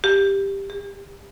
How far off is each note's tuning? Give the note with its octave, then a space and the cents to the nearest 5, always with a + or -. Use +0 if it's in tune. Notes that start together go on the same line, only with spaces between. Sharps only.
G4 +10
G4 +40